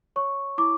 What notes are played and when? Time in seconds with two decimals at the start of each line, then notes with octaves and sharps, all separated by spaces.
0.16 C#5 C#6
0.58 E4 D6